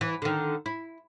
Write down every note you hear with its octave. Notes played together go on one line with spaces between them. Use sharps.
E3
D3 D#3
E4